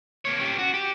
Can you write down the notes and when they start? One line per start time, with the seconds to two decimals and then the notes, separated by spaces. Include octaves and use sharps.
0.25 A#3 C#5
0.40 C#4 G4
0.58 F#4
0.74 G4